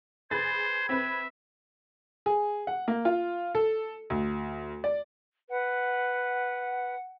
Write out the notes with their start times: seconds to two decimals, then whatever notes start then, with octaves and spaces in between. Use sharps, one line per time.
0.31 G#4 B4 C5 G#6 A6
0.89 C4 B4 E5
2.26 G#4
2.67 F#5
2.88 A#3
3.05 F4
3.55 A4
4.10 D2
4.84 D5
5.49 B4 F#5